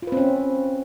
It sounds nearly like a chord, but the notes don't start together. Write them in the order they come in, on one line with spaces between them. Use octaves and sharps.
F4 B4 C4 C#4